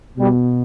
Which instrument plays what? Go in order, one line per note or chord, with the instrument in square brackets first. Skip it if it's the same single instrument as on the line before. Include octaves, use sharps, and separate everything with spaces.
[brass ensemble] B2 G3